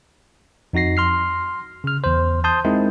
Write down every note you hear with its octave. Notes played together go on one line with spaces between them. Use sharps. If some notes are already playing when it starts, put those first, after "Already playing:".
F2 D#4 F#4 A#6 C7
C6 F6 C7
C#3 F6
E2 C5
A5 C6 D#6 G6
G#3 C4 D#4 E4 A#4